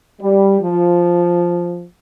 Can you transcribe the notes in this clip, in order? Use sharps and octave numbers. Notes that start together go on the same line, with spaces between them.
G3
F3